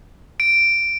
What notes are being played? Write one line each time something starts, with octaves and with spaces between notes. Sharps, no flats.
D7